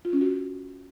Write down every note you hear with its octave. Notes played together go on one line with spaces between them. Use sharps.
F4
C#4
F#4